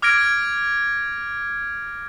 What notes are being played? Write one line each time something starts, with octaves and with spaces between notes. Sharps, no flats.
D6 F6 G#6 A#6 D7